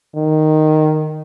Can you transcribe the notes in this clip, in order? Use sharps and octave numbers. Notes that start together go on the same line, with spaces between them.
D#3